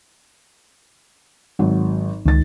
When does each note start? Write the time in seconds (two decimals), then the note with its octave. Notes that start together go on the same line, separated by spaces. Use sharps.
1.59 G#1 F#3
2.25 C#2 D#3 A6